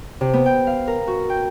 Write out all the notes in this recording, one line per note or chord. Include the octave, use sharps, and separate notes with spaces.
C3
B3
G5
F5
A#4
F#4
G5